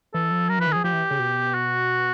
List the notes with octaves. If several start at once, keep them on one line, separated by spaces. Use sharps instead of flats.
E3 A4
F3
F#3 A#4
F3 B4
D#3
F3 G#4
F3 G4
E3
C#3
B2
F#4